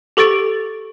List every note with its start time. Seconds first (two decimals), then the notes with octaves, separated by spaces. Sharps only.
0.17 G4 A4 C#6 A6 D7